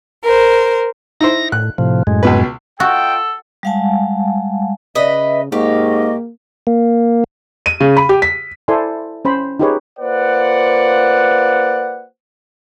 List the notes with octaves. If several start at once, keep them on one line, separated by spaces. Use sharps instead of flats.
A#4 C5
D#4 E4 C5 A#6
A2 F#6
A2 C3 F3
F#2 A2 G#3
C#2 B2 B4
F4 F#4 A4 D#5 G5
G3 G#3 F5 F#5 G#5 A5
C#3 B4 D#5 E5
G#2 A#3 G4 D#5 F5 C#6
A#3
D#7
C#3
B5
G4
B6
E4 A4 C5 D5 G#5 C6
C#4 C5 B5
D#4 F4 G4 G#4 B4 C#5
A#3 F4 B4 C5 D5 F#5